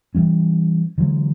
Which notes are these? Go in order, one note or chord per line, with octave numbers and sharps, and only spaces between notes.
E3 F#3 G3 C#4
D3 E3 F#3 G#3